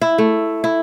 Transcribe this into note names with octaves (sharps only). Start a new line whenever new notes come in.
E4
A3
E4